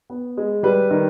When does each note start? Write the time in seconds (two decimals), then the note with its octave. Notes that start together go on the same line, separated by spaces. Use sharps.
0.10 B3
0.37 G#3
0.63 G3 B4
0.91 D#3